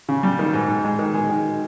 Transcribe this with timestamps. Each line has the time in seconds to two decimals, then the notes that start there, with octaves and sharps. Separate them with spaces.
0.09 C#3
0.23 G3
0.39 D#3
0.54 G#2
0.68 G#2
0.85 G#3
0.99 D#3
1.14 G#3
1.30 D#3